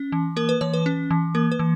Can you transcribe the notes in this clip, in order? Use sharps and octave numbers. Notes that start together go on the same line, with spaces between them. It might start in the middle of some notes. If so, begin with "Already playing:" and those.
Already playing: C#4
E3
A#3 A#4
B4
E3 C#5
B4
C#4
E3
A#3 A#4
B4
E3